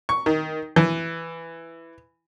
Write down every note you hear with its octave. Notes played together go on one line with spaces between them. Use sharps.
C#6
D#3
E3